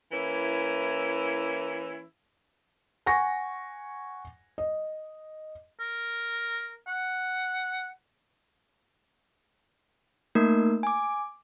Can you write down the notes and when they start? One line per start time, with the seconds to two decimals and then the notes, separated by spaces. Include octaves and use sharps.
0.12 E3 A#3 C#4 E4
3.06 F#5 G#5 C#6 A#6
4.58 D#5
5.80 A#4
6.87 F#5
10.35 A3 A#3 D#4 A#4
10.83 G#5 D6